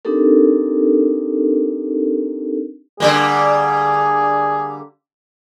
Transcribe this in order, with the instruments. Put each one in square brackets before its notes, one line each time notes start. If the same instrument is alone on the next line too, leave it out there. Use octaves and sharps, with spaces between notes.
[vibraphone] C4 D4 D#4 G4 A4 A#4
[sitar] D3 G3 A#3 [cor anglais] G#4